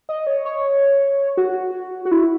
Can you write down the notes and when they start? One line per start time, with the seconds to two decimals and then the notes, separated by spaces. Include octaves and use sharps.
0.09 D#5
0.27 C#5
0.45 C#5
1.37 F#4
2.05 F#4
2.11 E4